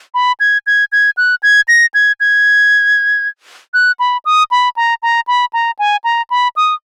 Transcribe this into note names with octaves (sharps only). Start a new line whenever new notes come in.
B5
G#6
G#6
G#6
F#6
G#6
A#6
G#6
G#6
F#6
B5
D#6
B5
A#5
A#5
B5
A#5
G#5
A#5
B5
D#6